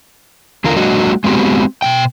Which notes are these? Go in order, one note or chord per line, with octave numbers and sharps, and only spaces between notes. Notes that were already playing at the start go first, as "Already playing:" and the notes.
E2 D3 F4 A#4
F#3 G#3 A#3 D4 F#4 D#5
G#3 B3 C4 F#4 G4
B2 A#3 G5